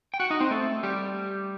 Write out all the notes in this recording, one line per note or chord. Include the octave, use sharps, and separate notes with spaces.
G5
F#4 F#5
D#4 D#5
C4 C5
A3 A4
G3 G4